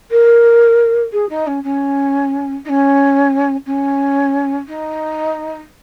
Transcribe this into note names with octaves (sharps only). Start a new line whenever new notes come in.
A#4
G#4
D#4
C#4
C#4
D#4
C#4
C#4
D#4